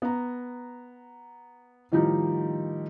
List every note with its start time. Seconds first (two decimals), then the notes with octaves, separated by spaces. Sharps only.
0.02 B3 A#5
1.92 A2 D#3 F3 G3 D#4